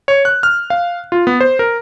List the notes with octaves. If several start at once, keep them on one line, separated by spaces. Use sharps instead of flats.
C#5
F#6
F6
F5
F4
B3
C5
A#4